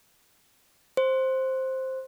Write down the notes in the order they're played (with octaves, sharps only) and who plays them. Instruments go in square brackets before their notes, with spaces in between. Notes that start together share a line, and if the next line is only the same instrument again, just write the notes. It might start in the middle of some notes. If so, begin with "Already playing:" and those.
[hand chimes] C5